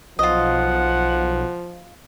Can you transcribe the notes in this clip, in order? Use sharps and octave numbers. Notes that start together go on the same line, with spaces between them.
B1 F3 F4 D#5 F#5